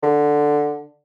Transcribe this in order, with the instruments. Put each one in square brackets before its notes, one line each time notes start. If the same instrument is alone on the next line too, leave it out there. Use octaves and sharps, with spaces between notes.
[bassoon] D3